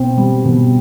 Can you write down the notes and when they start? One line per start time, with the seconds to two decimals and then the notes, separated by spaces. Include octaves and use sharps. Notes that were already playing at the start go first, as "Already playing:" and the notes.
Already playing: B2 C4
0.18 G3
0.45 B2